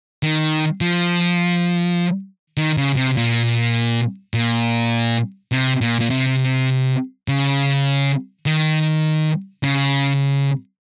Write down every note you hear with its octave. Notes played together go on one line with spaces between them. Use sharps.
D#3
F3
D#3
C#3
C3
A#2
A#2
C3
A#2
A#2
C3
C#3
D#3
C#3